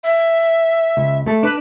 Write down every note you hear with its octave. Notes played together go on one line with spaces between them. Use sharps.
E5
C#2
A3 A4
D4 B4